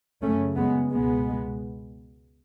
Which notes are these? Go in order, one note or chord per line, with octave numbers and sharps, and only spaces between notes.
F#2 C#3 A3 C#4
G#3 B3
C#2 B2 G#3 B3